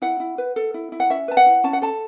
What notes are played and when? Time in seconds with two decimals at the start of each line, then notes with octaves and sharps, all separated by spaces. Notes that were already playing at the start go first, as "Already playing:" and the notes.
0.02 E4 F#5
0.20 E4
0.38 B4
0.56 A4
0.74 E4
0.92 E4
1.00 F#5
1.10 C#4 E5
1.28 B4 A5
1.37 F#5
1.46 E4
1.64 C#4 A5
1.73 F#5
1.82 A4 A5